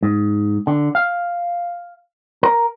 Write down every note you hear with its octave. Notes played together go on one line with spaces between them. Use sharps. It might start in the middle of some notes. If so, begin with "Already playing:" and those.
G#2
D3
F5
A#4